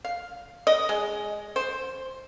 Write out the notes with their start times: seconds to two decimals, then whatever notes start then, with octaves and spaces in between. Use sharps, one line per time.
0.05 F5
0.67 D#5
0.89 G#3
1.56 C5